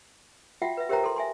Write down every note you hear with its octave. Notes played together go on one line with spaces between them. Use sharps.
F4 F#4 E5 F#5 G5
B4 E5
G4 A#4 C5 E5 G5 A#5
A4 C6
E5 G#5 C6